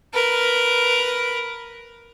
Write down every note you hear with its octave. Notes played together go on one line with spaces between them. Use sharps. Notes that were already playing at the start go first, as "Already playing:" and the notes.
A#4 B4